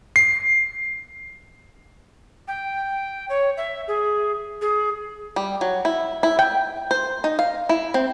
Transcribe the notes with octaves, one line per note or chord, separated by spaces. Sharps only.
C7
G5
C#5
E5
G#4
G#4
G3
F#3
E4
E4
G5
C5
D#4
F5
E4
C4